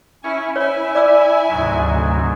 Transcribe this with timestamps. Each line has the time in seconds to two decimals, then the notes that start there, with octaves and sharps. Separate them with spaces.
0.24 C#4 E4 G#5 C#6
0.56 E4 C#5 E5 G#5
0.95 D5 D6 E6
1.48 D2 G#2 C3 F#3